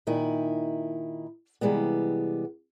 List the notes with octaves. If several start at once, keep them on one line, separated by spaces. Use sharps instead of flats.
A#2 D#3 D#4 E4
C3 E3 G3 G#3 B3